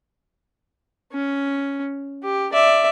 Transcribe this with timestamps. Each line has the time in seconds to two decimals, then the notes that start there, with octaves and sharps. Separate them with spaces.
1.12 C#4
2.23 G4
2.53 D5 E5